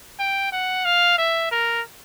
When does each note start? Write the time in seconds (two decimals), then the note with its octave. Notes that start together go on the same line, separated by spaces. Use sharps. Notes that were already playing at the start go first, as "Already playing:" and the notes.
0.20 G5
0.52 F#5
0.85 F5
1.18 E5
1.51 A#4